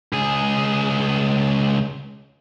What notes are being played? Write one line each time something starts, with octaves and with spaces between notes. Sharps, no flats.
C#2 G#4